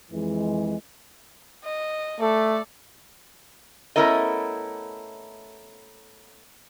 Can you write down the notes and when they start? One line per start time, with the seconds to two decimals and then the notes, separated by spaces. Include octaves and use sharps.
0.12 F2 E3 G#3
1.64 D#5
2.20 A3 A4 D5
3.96 A3 B3 C#4 E4 A#4 D#5